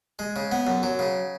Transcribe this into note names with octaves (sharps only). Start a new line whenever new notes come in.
G#3
C#3
B3
F#2
F#3
C#3